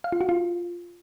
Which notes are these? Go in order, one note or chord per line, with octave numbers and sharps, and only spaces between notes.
F5
F4
F#4
F4